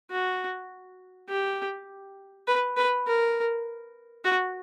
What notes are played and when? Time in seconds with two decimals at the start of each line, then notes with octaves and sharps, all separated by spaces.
0.11 F#4
1.29 G4
2.47 B4
2.77 B4
3.07 A#4
4.25 F#4